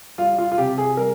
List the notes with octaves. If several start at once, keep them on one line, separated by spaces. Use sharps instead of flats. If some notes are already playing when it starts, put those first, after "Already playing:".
G3 F4
F4
F4
C3 G4
G#4
G3 A#4